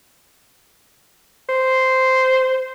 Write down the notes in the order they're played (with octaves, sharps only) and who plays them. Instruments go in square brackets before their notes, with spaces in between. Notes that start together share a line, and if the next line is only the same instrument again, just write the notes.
[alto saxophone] C5